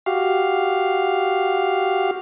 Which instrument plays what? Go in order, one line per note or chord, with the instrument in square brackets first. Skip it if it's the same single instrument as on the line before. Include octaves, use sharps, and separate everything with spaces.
[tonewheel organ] F#4 G4 F5